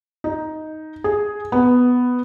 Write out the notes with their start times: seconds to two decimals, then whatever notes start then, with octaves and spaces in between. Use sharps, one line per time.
0.24 D#4
1.04 G#4
1.52 B3